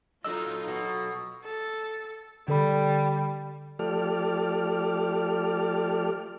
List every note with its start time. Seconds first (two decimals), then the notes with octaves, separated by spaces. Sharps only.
0.25 F#3 D#4 F4 A4 D#5 E6
0.68 B2
1.44 A4
2.48 D3 G3 A4 B5
3.79 F3 A3 G4 A4 D5 F6